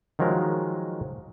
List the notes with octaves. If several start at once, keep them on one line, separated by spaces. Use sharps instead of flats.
D#3 F3 F#3 G#3 A#4